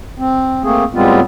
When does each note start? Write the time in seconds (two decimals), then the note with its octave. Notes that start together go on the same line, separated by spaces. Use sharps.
0.18 C4
0.64 A3 A#3 C4 G#4
0.94 A2 G3 G#3 B3 C4 F4